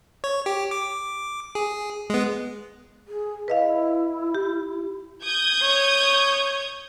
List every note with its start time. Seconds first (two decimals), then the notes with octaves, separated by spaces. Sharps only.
0.24 C#5
0.46 G4
0.71 D6
1.55 G#4
2.10 G#3 B3
3.07 G#4
3.48 E4 B4 D#5 F5
4.35 G4
5.23 D#6 G6 G#6
5.62 C#5